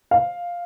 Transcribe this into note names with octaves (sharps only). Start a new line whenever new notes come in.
F5